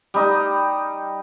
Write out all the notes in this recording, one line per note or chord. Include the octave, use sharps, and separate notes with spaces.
G3 D#4 D#5